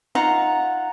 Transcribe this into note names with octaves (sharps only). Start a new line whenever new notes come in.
D#4 F4 F#5 A#5